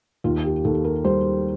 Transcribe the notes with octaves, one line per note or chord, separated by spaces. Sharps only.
D#2 F4
G4
D#2 A4
A#4
G3 C5